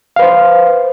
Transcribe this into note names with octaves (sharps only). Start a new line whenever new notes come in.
B4 C5 F5